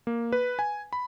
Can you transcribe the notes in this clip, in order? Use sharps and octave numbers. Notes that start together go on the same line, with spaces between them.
A#3
B4
G#5
B5